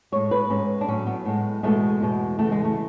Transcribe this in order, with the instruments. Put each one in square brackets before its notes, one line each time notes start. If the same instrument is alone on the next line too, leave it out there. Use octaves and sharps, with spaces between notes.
[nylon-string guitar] A2 G#3 C#5
B4
G#2 G#3 C#4
D4
A2 F#3 C#4
B3
A2 G#3
E2 B2 G#3 A3
E2 B2 G#3
E2 C#3 E3 A3
G#3
A3